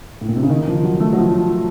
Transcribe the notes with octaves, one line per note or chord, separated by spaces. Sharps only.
A2
A#2
C3
C#3
D#3
F3
F#3
A3
F#3
F3